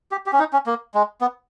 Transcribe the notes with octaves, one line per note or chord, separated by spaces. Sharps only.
G4
G4
C#4
D#4
C#4
A#3
G#3
B3